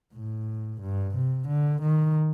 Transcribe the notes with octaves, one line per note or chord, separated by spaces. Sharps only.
A2
G2
C3
D3
D#3